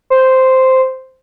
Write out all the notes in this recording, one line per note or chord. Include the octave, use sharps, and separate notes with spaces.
C5